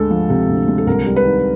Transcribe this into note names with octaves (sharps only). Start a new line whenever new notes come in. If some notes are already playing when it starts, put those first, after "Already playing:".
Already playing: D2 G#3 A4
F3
C3
D2
G#3
A4
C2 A#4
G3
B4
D#3